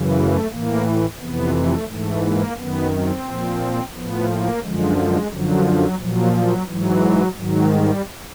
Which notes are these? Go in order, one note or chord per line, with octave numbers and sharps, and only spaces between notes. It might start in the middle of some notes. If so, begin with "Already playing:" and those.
Already playing: F#2 C#3 E3
A3
A2 E3 A#3
F2 C3 E3 B3
A3
G#2 E3 A3
A#3
F#2 D#3 B3
C4
A#2 F3
A2 F3 B3
A#3
F#2 D3 F3 G#3
G#3
F#2 D3 F3 F#3
F#3
A#2 F3 F#3
F#3
G#2 E3 F#3
G#2 D#3 F#3
G3